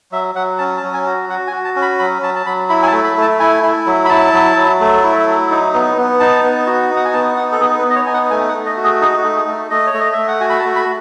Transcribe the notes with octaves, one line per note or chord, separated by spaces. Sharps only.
F#3 E5
F#3 F#5
C#4 A5
A5
F#3
G#5
F#4
F#4 F#5
G#5
F#4
A5
C#4
B5
F#3 B5
F#3 A5
A5
F#3 B5
E4 B5
G#5
A5
A3
B5
A3 A5
E4 G#5
E4
F#3
B5
E4 A5
F#3
F#3
A3
E4
F#3
D#4
B3
B3
D#4 A5
B3
F#4
D#4
F#5
G#5
B3 A5
D#4 F#5
A4
B3 G#4
B4
B3
D#5
C#5
D#4 G#5
F#5
A3 G#5
F#5
A3
D#5
F#4
G#4
D#4 G#4
F#4
A3
G#4
A3
A3 D#5
C#5
A3
D#5
A3 E5
F#5
F#4 G#5
B5
A5
A3
B5